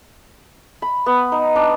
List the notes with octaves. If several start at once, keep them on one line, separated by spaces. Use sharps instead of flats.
B5
B3
D#4
D4